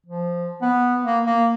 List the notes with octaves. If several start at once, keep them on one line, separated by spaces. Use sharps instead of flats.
F3
B3
A#3
A#3